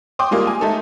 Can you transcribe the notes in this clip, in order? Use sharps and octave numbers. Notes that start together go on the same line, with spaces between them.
G5 C6 D6 D#6
G3 G#3 A#3 F4
G#5
G#3 A3 D#4 A4